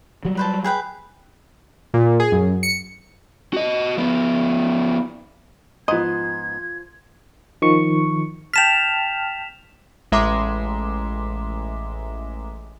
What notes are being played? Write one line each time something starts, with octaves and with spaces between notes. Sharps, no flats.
F#3 G3
B4 C5 A5
G#4 B4 G5
A#2
G#4
F#2
C#7
F#4 D#5
F3 B3
G#2 F3 B3 D#5 C6 G#6
D#3 F3 C#6
G5 A5 F6 B6 E7 F7
A1 G#3 E5 A#5 C6 D6